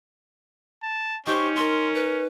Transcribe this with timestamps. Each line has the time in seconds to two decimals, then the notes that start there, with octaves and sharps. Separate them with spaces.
0.83 A5
1.27 C#4 D#4 G4 C5 C#6
1.56 A#4 C6
1.95 B4